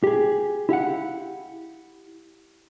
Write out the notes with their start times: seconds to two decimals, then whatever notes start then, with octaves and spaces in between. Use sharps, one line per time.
0.04 G4 G#4
0.69 E4 G4 F5 F#5